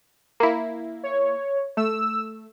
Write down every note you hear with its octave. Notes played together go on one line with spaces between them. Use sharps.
A#3 E4
C#5
A3 E6